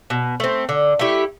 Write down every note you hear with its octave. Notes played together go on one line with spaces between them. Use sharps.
B2
A3 C4
D3
A3 E4 G4